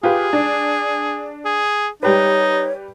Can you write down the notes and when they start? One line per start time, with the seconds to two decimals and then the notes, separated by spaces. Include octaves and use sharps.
0.03 F4 G4 G#4 B4
0.33 D4
1.45 G#4
2.03 G3 D#4 G4 B4 C#5